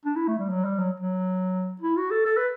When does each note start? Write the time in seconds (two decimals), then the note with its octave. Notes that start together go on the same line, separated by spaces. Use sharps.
0.06 D4
0.16 E4
0.28 A3
0.39 G3
0.50 F#3
0.65 G3
0.79 F#3
1.00 F#3
1.82 E4
1.97 F#4
2.11 A4
2.26 A4
2.37 B4